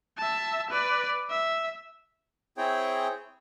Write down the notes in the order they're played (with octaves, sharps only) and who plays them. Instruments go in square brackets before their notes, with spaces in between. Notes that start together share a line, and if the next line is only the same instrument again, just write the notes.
[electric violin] E5 A5
B4 D5
E5
[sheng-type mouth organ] C4 E4 G#4 C#5 G5